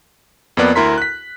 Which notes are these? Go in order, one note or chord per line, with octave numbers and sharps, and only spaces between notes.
F2 A#3 B3 D5 F#6
D2 E4 A#4 A#5 C6 B6
F#6 B6